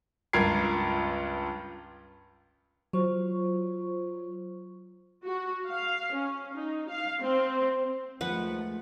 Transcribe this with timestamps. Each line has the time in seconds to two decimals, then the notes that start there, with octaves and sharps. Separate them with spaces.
0.33 C#2 G2 F4 A#4 G#6 C7
2.93 F#3 F4 C5 C#6
5.24 F#4
5.67 F5
6.13 C#4
6.54 D#4
6.89 F5
7.21 C4
8.21 D#2 F3 G#3 A3 B4 F#5